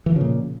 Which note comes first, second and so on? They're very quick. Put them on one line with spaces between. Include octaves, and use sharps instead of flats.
E3 F3 C#3 A#2